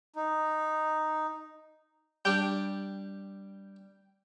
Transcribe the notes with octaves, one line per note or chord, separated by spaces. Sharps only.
D#4
G3 D4 G5